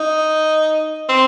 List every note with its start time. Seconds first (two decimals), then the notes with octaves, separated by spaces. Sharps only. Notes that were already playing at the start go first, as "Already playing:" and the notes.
Already playing: D#4
1.09 C4